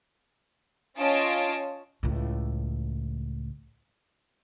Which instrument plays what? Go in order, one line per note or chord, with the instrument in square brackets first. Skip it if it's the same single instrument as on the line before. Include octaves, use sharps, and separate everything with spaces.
[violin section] C#4 F4 C#5 D#5 A5 D7
[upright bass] C#2 A2